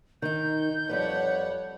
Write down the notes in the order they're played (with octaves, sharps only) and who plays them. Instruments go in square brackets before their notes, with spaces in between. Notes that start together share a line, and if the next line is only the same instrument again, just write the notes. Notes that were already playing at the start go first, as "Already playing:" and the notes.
[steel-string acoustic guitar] D#3 D#4 [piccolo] G6
[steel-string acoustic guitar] F2 G3 B4 [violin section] A4 C#5 F#5